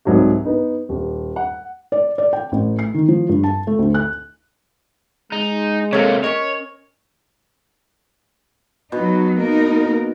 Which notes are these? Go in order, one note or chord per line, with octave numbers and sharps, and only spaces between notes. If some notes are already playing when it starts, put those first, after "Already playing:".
C2 G#2 F#3 D#4 F#4
B3 D#4
D#1
F#5
D5
D5
G5
A1
C7
D#3
F3
G2
A5
A3
D2
F#6
G#3 D#4
C3 A#3 A4 C#5
C#4 A#4 C#5 D#5
B2 F#3 D#4
A#3 D#4 A#4